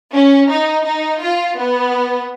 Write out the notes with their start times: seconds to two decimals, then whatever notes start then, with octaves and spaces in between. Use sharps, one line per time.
0.12 C#4
0.49 D#4
0.85 D#4
1.21 F4
1.57 B3